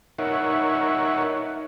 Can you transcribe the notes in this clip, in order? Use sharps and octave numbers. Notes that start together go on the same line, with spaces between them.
D#4 A#4 C#5 E5 F#5